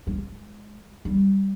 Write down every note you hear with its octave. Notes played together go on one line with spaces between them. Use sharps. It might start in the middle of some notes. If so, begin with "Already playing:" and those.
G#3
G3